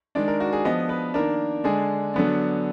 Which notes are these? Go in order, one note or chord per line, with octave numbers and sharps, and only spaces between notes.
D#3 G#3 D4 D5
A#4
F#4
G#4
F3 B3 D4 D#5
B4
D#3 A#3 D4 A#4
D3 G#3 D4 G#4
D3 F#3 B3 D4